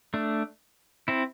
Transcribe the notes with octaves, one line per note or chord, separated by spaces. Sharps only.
A3 D4
C4 E4